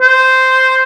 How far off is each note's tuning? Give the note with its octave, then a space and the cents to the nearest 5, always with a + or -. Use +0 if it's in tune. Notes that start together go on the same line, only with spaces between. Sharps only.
C5 -5